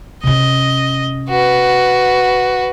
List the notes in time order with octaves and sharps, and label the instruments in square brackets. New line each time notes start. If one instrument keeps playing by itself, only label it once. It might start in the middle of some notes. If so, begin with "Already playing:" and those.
[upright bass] C3 C#4 [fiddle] D#5
[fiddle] F#4 B4